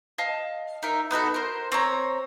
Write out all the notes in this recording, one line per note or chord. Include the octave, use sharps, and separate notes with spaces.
D#5 F5 A5
D#4 A#4 E5
B3 D#4 F#4 A4
A#4 C5
C4 C#5 A#5